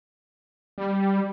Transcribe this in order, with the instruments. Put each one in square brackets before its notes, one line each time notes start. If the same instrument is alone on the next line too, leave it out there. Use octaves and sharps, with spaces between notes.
[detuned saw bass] G3